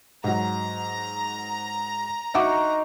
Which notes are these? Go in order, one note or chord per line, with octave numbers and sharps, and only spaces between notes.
G#2 F#3 A#5
D#4 F#4 E5 F#5 C6 D6